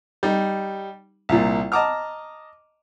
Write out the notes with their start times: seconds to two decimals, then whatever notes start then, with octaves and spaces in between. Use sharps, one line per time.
0.23 G3 D#4
1.29 C2 A#2
1.72 D#5 A5 A#5 D6 D#6 F6